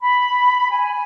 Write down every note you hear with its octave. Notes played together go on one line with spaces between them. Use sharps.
B5
G#5